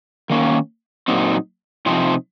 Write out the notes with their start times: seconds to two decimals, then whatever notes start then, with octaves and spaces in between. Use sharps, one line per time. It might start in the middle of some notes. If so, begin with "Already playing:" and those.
0.30 D#3 A#3 C#4
1.08 A#2 F#3 C4 D#4
1.86 C3 F3 C4 D#4